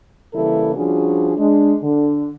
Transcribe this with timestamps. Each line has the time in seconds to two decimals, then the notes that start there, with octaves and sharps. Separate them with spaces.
0.34 C#3 E3 G3 A#3 E4 A4
0.75 F3 G3 C#4 D4 F#4 G#4
1.37 G#3 D4
1.82 D3